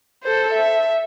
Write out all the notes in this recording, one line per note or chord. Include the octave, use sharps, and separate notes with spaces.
A4 C5
E5